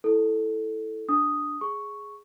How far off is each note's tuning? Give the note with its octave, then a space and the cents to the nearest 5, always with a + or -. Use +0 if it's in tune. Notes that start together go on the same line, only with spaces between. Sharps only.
E4 +0 A4 +0
D4 +0 D#6 +0
G#4 +0 C#6 +0